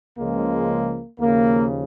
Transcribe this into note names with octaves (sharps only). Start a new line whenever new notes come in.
C#2 C#3 F3 G#3 A#3
D#2 C#3 F3 A#3